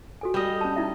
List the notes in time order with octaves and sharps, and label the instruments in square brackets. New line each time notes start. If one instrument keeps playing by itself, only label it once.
[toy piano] F#4 A4 G#5
[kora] G3 D#5
[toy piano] C#4 A5
D#4 E4 E5